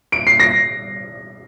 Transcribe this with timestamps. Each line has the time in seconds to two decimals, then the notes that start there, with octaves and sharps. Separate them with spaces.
0.12 D7
0.27 C7
0.40 A#6